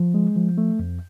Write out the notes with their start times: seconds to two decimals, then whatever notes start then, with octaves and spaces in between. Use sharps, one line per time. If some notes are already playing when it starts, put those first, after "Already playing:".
Already playing: F3
0.14 G#3
0.36 F3
0.58 A3
0.79 F2